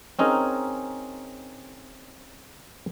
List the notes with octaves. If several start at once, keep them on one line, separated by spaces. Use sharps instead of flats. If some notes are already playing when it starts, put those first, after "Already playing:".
C4 C#4 D#4 G#4 A#4